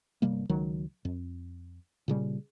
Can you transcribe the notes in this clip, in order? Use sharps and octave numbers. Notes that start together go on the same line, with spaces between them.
G1 C3 G3 A#3
C#2 D#3 F#3
F2
A#2 C#3 G3